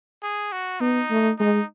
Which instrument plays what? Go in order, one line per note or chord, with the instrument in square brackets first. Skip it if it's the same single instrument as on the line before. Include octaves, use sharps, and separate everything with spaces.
[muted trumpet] G#4
F#4
[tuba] B3 [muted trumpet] D#4
[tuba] A3
[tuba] G#3 [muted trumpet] D#4